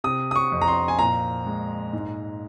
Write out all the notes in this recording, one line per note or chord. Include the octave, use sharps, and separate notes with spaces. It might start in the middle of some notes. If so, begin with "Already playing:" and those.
C3 D#6
D#6
C#6
F2
A#5
C6
G#5
A#2 A#5
G#3
G#2